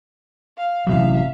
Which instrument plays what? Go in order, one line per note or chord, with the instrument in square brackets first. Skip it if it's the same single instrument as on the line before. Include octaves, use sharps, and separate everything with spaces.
[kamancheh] F5
[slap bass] A1 C3 F#3 [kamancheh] E5 F5